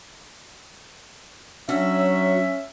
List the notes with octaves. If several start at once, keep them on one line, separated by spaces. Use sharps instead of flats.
F#3 C#4 D4 F#4 E5